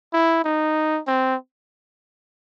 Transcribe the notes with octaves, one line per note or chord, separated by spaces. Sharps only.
E4
D#4
C4